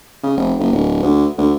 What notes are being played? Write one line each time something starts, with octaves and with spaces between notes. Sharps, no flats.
C#3
F1
F#1
D1
D2
D2